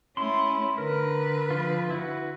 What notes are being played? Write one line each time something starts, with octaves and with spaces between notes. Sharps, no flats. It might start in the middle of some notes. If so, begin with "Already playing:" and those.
A3 C#4 E4 C6
D3 A#4 B4
F3 F4
E4 F#4